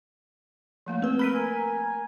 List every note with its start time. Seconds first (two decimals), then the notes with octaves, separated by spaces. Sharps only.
0.86 F3 A3 A#3
1.02 C4 B4 E6
1.19 A#4 B4 B5 B6 D#7
1.34 A#4 G#5